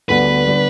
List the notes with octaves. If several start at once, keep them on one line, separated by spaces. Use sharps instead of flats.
D2 D3 G3 B3 B4
D3 G3 B3